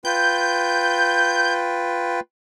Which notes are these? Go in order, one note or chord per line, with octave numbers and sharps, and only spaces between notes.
F4 B4 G5 G6